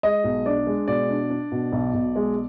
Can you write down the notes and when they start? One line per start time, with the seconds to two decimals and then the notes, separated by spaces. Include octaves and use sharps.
0.03 G#3 D#5
0.24 B1
0.46 D4 D5
0.67 G#3
0.88 B2 D5
1.10 D4
1.30 D4
1.52 B2
1.72 B1
1.94 B1
2.16 G#3